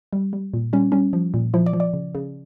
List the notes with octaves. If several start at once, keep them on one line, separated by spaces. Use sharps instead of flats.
G3
G3
A#2
G3 C#4
G3 C#4
F3
A#2
F3 E4
D5
F3
D5
C#3
C#3